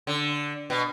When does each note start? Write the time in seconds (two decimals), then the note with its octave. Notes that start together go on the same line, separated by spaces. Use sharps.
0.07 D3
0.70 B2